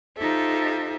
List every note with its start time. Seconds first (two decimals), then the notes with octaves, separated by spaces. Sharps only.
0.17 D#4 F4 G4 A4 C5 E5